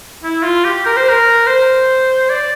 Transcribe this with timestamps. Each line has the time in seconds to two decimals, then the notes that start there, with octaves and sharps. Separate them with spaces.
0.24 E4
0.43 F4
0.64 G4
0.86 A#4
0.97 C5
1.09 A#4
1.46 C5
2.30 D5